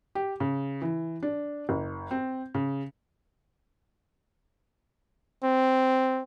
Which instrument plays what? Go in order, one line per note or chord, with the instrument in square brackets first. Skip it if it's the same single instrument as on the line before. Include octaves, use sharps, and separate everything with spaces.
[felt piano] G4
C#3
E3
D4
F#1
C4
C#3
[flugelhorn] C4